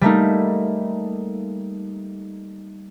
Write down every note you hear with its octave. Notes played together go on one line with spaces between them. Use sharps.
G3 A3 A#3 D#4